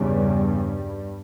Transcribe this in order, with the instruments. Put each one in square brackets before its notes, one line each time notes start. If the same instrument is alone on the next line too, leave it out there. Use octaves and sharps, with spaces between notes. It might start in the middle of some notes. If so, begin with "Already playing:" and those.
Already playing: [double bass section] E2 G2 C#3 G3